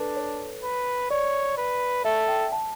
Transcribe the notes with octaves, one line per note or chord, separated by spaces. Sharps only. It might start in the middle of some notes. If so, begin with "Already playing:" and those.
Already playing: D4 A4 B4
C#5
B4
C#5 D5
B4
A4 E5
G5
A5